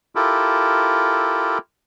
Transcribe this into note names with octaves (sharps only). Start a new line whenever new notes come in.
E4 F4 G4 A4 A#4